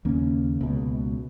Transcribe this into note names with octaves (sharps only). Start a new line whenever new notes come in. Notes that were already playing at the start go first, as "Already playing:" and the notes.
D#2 C#3 A#3 C#4
C#2 B2